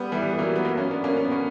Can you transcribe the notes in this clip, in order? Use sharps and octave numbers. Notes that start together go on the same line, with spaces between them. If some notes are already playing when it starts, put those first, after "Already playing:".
Already playing: G3 B3
E3 G3
G3
F#3 A#3
B3
F#3 A#3
A#3 C#4
B3 D4
A#3 C#4
C#4
B3
A#3 C#4